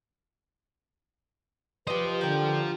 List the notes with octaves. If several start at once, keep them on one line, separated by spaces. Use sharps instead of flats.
D#4 F4 G4 B4 C5
D3 G4 A#4 G5